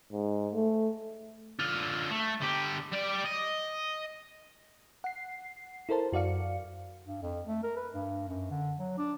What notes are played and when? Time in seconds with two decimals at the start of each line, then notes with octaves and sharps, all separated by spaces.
0.12 G#2
0.54 A3
1.59 D3 F4
2.12 A3
2.42 D3 G4
2.93 G3 D5
3.26 D#5
5.04 F#5 C7
5.89 E4 A4 A#4 C5 A5
6.12 F#2 F#4 D5 F5 C#7
7.06 G2
7.22 F2
7.46 A3
7.63 A#4
7.76 B4
7.94 G2
8.28 F#2
8.51 D3
8.79 F#3
8.98 D4